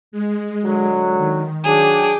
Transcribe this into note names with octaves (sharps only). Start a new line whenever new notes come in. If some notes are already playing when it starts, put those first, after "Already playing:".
G#3
D3 F#3
D#3
F#3 D4 G#4 G5 D6